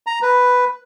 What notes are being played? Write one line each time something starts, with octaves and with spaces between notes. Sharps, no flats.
A#5
B4